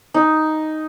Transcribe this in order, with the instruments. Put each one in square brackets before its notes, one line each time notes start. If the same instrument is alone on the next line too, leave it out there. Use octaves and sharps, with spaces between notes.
[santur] D#4